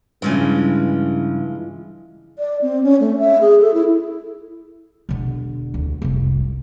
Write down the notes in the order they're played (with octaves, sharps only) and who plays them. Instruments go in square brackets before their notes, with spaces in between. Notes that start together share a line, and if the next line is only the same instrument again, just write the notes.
[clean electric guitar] G2 C#3 [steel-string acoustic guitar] E3 F3 G#3
[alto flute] D5
C4
C#4
A3
E5
G#4
A4
E4
[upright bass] E1 D3
D2
F1 C2